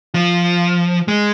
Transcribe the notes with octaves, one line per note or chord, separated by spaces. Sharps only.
F3
G#3